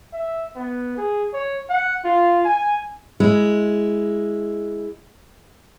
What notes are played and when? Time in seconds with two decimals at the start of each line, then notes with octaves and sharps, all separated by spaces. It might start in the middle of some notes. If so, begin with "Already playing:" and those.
0.13 E5
0.56 B3
0.98 G#4
1.33 C#5
1.70 F#5
2.05 F4
2.45 G#5
3.20 G#3 E4